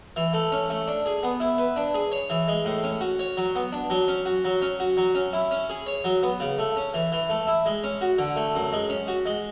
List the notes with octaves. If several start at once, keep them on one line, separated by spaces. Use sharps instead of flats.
E3
A3
C#4
A3
D4
G#4
B3
E4
B4
D4
G#4
C#5
E3
G#3
A2
C#4
F#4
C#5
F#3
B3
D4
F#3
C#4
F#4
F#3
C#4
F#4
F#3
C#4
E4
C#4
G#4
C#5
F#3
B3
C#3
A3
C#4
E3
E3
A3
E4
G#3
C#4
F#4
D3
A3
F#2
G#3
C#4
F#4
G#3